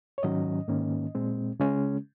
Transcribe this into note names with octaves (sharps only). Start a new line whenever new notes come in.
C#5
G#2 D#3 F#3 C#4 D#5
G#2 D#3 A#3 C#4
A#2 G#3 C4
C#3 G#3 C#4